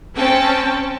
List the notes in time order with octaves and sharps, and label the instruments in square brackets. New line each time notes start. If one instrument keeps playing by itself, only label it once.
[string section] C4 C#4 G5 A5